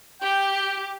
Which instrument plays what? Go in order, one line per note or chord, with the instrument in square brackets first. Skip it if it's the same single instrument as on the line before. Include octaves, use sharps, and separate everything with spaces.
[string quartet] G4 [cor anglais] G5